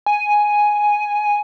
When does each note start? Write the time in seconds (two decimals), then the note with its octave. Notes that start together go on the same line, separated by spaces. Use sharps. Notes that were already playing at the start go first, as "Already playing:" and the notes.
0.06 G#5